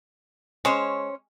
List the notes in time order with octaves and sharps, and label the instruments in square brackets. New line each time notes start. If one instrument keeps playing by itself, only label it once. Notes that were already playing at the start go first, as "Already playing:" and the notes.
[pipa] G#3 [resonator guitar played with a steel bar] C#4 C5 C#5